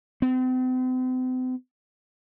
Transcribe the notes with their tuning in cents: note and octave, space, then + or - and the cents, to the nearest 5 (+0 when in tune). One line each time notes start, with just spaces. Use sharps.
C4 -40